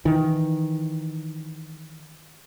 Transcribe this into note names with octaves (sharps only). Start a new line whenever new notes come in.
D#3 E3